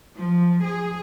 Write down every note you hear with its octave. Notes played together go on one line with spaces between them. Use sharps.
F3
G#4